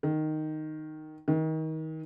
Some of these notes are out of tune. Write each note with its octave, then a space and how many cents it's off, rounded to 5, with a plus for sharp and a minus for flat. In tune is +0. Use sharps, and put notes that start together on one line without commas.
D#3 -5
D#3 +30